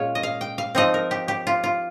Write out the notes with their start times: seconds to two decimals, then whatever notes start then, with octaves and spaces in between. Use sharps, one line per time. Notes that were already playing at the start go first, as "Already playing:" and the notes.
Already playing: A#2 G#3 C#4 F4 C#5
0.15 D#5
0.23 F5
0.41 G5
0.58 F5
0.75 F3 C4 D#4 D#5
0.94 A#4
1.11 G4
1.28 G4
1.47 F4
1.64 F4